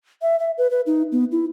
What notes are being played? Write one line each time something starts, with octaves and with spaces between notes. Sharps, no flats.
E5
E5
B4
B4
D#4
B3
E4